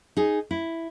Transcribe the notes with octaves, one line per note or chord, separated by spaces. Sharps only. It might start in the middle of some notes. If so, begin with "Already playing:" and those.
D#4 G#4
E4